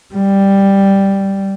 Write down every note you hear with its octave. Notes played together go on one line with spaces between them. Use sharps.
G3